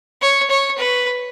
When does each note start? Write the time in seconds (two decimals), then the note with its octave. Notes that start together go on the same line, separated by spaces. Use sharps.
0.22 C#5
0.50 C#5
0.78 B4